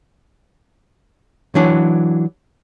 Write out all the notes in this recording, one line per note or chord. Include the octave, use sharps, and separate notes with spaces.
E3 F#3 D4